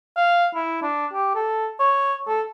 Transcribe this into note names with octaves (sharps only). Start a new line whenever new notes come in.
F5
E4
D4
G4
A4
C#5
A4